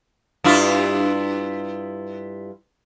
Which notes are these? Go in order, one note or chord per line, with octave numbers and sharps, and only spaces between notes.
G2 E4 F4